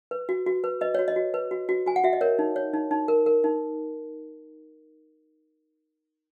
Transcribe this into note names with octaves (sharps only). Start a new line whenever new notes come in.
B4
F#4
F#4
B4
B4 D#5
F#4 C#5
D#5
F#4
B4
F#4
F#4
F#4 G#5
F#5
F#4 E5
D#5
A#4 C#5
D#4
C#5
D#4
D#4
A#4
A#4
D#4